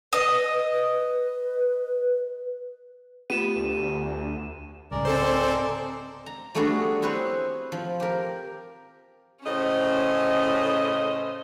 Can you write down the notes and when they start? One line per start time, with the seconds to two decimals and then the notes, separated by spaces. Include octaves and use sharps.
0.13 B4 D#5
0.74 B4
3.30 A3 B3 F4 G4 D#7 E7
3.56 D2
4.91 C2 G#2 C#3 G#3 A#4 D5
5.05 C4 A4 C5
6.26 A#5
6.55 G3 A3 B3 D4 F#4 G#4
7.02 C4 E4 G#4 B4 C#5
7.72 F3
8.00 G4 A#4
9.45 A2 C#3 C#4 C5 D#5